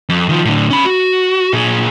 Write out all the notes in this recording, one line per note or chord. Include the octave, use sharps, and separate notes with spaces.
F2
D#3 F3
A2 D3
C#4 B5
F#4
A#2 G#4